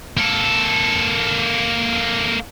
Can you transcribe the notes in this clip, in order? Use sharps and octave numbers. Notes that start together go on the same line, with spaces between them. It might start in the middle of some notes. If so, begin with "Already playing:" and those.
A#3 A4